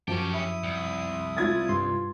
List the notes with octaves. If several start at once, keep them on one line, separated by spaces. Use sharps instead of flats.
F#2 F3 C#4 G4 A5
E4 D#6
C2
F4 G#6 A6
G2 C6